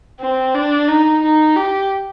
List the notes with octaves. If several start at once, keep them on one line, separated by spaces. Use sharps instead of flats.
C4
D4
D#4
D#4
G4